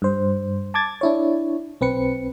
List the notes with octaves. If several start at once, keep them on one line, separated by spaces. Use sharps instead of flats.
G2 C5
A5 D6 G#6 A6
D4 E4 C#5
B1 C4 B4 C#7